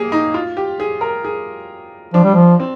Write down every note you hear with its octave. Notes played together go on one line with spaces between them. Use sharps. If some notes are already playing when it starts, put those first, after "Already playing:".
Already playing: A#3 G4 G#4
D#4
F4
G4
G#4
A#4
G#4
F3 D4
G3
F3
C4